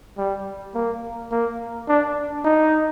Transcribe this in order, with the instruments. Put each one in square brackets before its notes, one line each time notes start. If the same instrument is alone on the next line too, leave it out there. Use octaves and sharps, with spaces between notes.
[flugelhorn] G3
A#3
A#3
D4
D#4